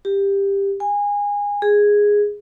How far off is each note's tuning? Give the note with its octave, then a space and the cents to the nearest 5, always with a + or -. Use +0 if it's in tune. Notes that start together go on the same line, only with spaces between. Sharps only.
G4 +15
G#5 -25
G#4 -5